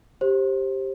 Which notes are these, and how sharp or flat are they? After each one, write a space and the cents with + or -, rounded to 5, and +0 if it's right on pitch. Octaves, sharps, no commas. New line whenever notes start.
G4 +0 C5 +20